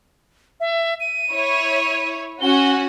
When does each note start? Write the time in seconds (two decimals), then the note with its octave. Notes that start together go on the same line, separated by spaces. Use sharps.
0.60 E5
1.00 D#7
1.30 E4 C#5
2.41 C#4 F#4 G7